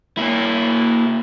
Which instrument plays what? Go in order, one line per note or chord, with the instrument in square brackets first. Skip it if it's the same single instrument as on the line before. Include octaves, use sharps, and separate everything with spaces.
[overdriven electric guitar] A#3 E4